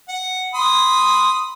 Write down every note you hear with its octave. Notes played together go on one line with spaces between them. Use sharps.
F#5
B5 C6 D#6